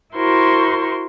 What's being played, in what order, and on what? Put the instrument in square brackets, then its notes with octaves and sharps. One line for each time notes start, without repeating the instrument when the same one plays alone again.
[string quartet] E4 F#4 A#4 C5 C6 C#6